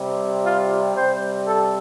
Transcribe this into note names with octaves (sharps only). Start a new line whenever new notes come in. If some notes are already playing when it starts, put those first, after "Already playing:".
Already playing: C3 G3 C4
F4
C3 G3 C4 C5
A4